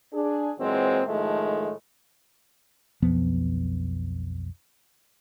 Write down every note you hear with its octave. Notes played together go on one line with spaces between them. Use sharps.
D4 G#4
A#2 E3 F#3 G#3 C4
A2 D#3 F3 G#3 A3
B1 F2 F3 B3